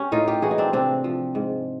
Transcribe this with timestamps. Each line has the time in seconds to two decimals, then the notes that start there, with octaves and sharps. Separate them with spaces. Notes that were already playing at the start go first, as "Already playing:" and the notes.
Already playing: C#4 G4
0.12 A2 D#4 F4
0.28 F4 G4
0.42 E3 F#4 G#4
0.51 D#4
0.58 C4 D4
0.73 C3 C4 D4
1.04 F3
1.35 G#2